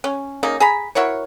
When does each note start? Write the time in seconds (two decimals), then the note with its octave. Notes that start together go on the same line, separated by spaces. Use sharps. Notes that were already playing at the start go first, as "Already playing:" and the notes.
0.04 C#4
0.43 C#3 A#3 D#4
0.60 G#4 A#5 B5
0.95 E4 F#4 A#4 C#5